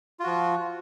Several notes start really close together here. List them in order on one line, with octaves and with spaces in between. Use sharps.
F4 F#4 F3